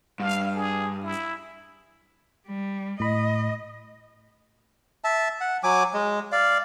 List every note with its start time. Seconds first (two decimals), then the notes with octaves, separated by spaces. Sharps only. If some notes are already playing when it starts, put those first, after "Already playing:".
0.20 G2 F5
0.55 G#4
1.03 E4
2.47 G3
3.00 A2 D#5 B5
5.04 E5 A5
5.41 F#5
5.63 F#3 G#5 D6
5.94 G#3
6.32 D5 F5